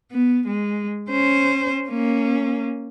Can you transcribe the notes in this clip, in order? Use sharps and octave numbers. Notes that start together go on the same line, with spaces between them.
B3
G#3
C#4 C5
A#3 C#4